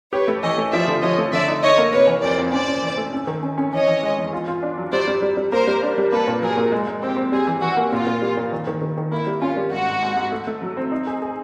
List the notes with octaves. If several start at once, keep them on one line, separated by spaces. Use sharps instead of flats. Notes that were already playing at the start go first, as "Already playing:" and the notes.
G4 B4 C#5
A3
E3 C#5 D#5
A3
F3 D5 E5
D3
F3 C#5 D#5
A3
D3 D5 E5
D#4
D#4 C#5 D#5
A#3
C3 B4 C#5
E3
F2 C5 D5
F2
C#4 C5 D5
C#4
E3
A3
C#4
D#3
C#4
C#4
E3 C#5 D#5
E3
G#3
E2
F4
F4
D4
F#3
G3 C5 D5
G3
G3
G3
A#3 A#4 C5
G3
D4
G3
A#3 A4 B4
A#2
F#3 G#4 A#4
A#2
G#3
G#3
C4 G4
C4
G3 G#4
E3
E3 F#4
A#3
A#2 F4
A#2
G3
A#2
D#3
D#3
D#3
D#3
A#3 E4
G3
C#4 F4
G3
G#2 F#4
G#2
G#2
G#2
A3
A3
F#3
C4
D#4
G#4
G#4